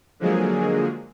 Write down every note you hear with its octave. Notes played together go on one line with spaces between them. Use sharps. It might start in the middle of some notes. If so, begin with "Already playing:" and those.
D3 F3 F#3 G#3 A#3 G#4